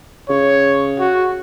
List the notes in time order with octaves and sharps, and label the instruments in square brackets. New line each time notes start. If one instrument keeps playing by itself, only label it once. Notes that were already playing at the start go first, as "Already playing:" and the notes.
[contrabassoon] C#3 [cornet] C#5
[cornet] F#4